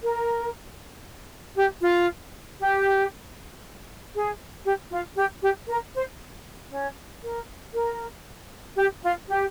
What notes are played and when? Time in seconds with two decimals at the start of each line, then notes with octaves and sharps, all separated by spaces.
0.02 A#4
1.57 G4
1.82 F4
2.59 G4
4.14 G#4
4.65 G4
4.91 F4
5.17 G4
5.42 G4
5.68 A#4
5.95 C5
6.71 C#4 C#5
7.23 A#4
7.74 A#4
8.77 G4
9.03 F4
9.29 G4